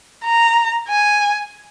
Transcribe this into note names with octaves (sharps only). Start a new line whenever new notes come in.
A#5
G#5